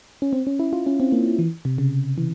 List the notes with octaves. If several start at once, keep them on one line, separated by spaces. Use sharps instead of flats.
C#4
C4
C#4
E4
F4
C#4
C4
A#3
E3
C3
C#3
E3